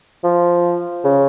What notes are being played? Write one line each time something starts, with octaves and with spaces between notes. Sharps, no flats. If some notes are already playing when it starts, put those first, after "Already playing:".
F3
C#3